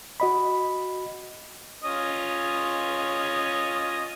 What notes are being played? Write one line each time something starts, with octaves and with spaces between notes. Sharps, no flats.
F#4 D#5 B5
C#4 F4 D#5